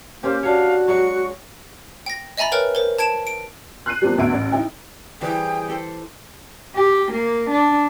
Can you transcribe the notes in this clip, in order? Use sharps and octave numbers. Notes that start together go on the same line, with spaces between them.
A#3 C#4 G4 C5
D4 F#4 C#5 F5
F#3 G#3 C#6
G5 A#6
D#5 E5 G#5 A#5 B5 A6
A#4 B4 C#5 G5 F6
A#4 C5
A5 G#6 D7 E7
D7
F#6 C7 D#7
E2 A#2 F3 G3
D2 B2 E5 D7
A1
D#4 E4 G5
E3 G3 G#4 C5 G5
G4 A4 C5
G4
A#3
D4